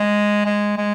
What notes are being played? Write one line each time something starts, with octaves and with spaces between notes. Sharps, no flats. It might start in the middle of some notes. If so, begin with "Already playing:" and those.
Already playing: G#3
G#3
G#3